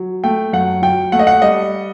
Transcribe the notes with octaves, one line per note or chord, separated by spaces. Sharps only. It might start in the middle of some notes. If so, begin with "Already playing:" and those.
Already playing: F#3
A3 G5
F#2 F#5
F#3 G5
A3 F#5
D#5
F#5
G3 D#5